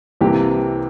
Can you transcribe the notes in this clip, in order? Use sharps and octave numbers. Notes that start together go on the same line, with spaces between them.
C2 C3 E3 A#3 G4